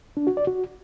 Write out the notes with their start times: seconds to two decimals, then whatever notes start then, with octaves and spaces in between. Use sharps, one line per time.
0.17 D4
0.27 F#4
0.37 D5
0.47 F#4